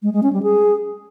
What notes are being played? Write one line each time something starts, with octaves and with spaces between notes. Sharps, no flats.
G#3
G#3
C#4
G3
G#4